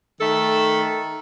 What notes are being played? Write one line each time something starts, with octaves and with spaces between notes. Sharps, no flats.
D#3 A3 A4